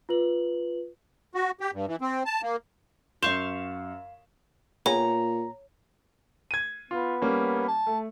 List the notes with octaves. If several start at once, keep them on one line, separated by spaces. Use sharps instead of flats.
F4 B4 F#7
F#4
G4
G2
E3
C4
A5
A#3
F#2 F5 C6 C#6 G6 E7
A#2 B3 G#4 C#5 A#5
G#6 D#7
B3 F4
G3 A#3 C#4
A5
A3